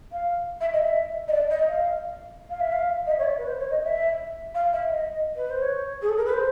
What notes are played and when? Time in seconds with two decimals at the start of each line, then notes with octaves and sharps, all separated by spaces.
0.12 F5
0.61 E5
0.73 D#5
0.85 E5
1.28 D#5
1.32 D5
1.50 D#5
1.68 F5
2.50 F5
2.60 E5
2.72 F5
3.06 D#5
3.11 E5
3.19 C#5
3.24 D5
3.38 B4
3.48 C5
3.60 C#5
3.71 D#5
3.84 E5
4.55 F5
4.73 E5
4.91 D#5
5.36 B4
5.50 C5
5.62 C#5
6.02 G#4
6.09 A4
6.17 A#4
6.25 B4
6.33 C5